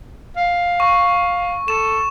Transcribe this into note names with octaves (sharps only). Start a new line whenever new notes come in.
F5
C#6
A4 E7